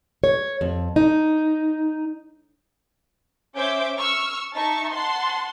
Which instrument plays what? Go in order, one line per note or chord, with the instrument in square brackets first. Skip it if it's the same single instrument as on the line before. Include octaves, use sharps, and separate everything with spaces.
[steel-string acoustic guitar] C#5
F2
D#4
[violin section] C#4 C5 E5 D6 G6 D7
C#6 E6 F6
D#4 E5 A5 C#6
F#5 A5 C6